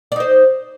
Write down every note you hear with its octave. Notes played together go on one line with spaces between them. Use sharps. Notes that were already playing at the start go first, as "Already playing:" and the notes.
D#4 C5 D5